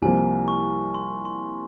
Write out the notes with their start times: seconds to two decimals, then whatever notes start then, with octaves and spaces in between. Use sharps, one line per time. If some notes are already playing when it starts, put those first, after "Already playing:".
0.02 C2 C3 F3 A#3 G#5
0.48 C#6
0.94 C6
1.25 C6